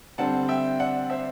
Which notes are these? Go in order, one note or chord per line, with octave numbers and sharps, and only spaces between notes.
D3 G3 C4 F#5 A5
E5 G5
D5 F#5
C5 E5